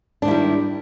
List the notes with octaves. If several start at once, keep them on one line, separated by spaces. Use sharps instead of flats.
D#3 G3 D4 E4